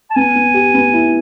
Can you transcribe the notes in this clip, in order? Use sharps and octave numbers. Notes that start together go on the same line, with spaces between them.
A5
B3 G#5
B3
G4
B3
E4